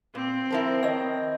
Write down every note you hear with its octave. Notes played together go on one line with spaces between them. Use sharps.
A#2 C4
F3 E4 A#4 C5
D#3 C#5 D#5